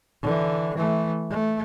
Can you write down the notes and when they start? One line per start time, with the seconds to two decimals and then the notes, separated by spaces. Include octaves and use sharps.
0.23 D3 E3
0.76 E3 A3
1.30 A3